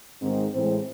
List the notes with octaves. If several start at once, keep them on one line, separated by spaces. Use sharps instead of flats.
G#2 D#3 G#3 C4
A2 E3 G#3 C4